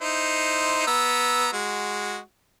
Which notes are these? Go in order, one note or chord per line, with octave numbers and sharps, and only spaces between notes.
D#4 E4 C5
B3 A#5 E6
G#3 F#4